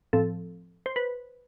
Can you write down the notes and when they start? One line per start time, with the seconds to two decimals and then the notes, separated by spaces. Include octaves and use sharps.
0.13 A2 F3 C4 A4
0.86 C5
0.96 B4